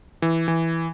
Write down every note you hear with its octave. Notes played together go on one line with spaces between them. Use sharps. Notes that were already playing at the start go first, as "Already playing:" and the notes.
E3
E3